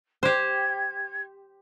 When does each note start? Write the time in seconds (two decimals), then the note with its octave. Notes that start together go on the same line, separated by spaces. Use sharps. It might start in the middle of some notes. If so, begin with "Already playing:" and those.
0.23 G4 C5 G#6